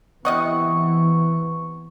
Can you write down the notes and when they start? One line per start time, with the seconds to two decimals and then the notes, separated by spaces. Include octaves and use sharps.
0.25 C3 E3 B3 D#5 F#5 C#6